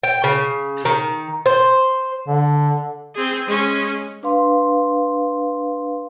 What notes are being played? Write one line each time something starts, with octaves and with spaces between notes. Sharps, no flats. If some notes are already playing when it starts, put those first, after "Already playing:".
G5
C#3
D#3
C5
D3
C4 G#4
G#3 C#4
D4 B4 F5 C6